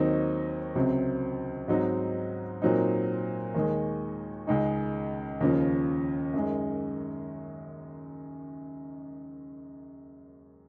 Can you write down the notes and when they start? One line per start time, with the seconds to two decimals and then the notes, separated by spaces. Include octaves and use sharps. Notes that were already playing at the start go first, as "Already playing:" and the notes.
Already playing: D#2 D#3 F#3 C4 D#4
0.75 C#2 C3 F#3 C4
1.68 G#2 F#3 C4 D#4
2.62 A#2 F#3 C4 D#4
3.55 D#2 D#3 G#3
4.47 C#2 C#3 G#3 D#4
5.41 D#2 C#3 F3
6.34 F#2 D#3 G#3